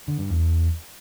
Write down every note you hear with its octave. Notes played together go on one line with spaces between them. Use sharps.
D3
G2
E2